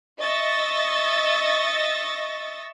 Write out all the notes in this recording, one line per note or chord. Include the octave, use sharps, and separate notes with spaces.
D#5 E5 C#6 E6 A6 A#6